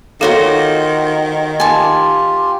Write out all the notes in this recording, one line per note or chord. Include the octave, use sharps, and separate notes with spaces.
D#3 F4 F#4 A4 C5 C#5 A#6
F4 G4 G#5 A5